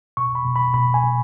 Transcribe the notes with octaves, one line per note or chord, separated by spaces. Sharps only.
B2 C#6
B5
B2
B5
B2 B5
G#5
B2